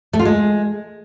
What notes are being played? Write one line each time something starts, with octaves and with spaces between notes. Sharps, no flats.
A3
F4
G#3